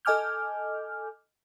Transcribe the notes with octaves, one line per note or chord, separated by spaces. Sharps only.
A4 D#5 G#5 D6 F6 G6